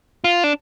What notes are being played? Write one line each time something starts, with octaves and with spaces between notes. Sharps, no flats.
F4
D4